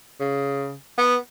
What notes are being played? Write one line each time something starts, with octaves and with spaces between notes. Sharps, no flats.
C#3
B3